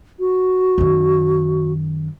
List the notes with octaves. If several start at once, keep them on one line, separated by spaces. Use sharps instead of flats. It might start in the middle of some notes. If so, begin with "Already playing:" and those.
F#4
F#2 D#3